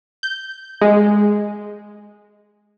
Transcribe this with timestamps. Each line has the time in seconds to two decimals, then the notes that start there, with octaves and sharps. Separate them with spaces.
0.23 G6
0.81 G#3